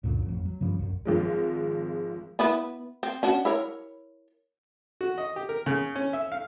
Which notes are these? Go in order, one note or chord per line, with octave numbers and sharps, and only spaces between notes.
C#2 F#2 A#2 D3
A1 F2
F#3
G2 C#3 F3 G3
B1 F#2
G#1 F3 G#3
B3 E4 B4
C4
C#4 D4 F#4
E4 A#4 C#5
F#4
D#5
G4
A#4
C#3
C#4
E5
F5